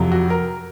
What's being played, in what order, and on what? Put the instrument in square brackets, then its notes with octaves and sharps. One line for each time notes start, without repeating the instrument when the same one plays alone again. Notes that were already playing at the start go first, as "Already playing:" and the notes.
Already playing: [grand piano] F2 C3 F#3
F#4
A#4